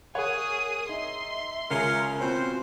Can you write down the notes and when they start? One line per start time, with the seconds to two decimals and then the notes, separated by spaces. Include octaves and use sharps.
0.15 G#4 A#4 C#5 F#5 D#6
0.89 D#4 E5 C6
1.71 C#2 C#4 F4 G#4 A#4
2.20 B2 C4 C#4 F4 C5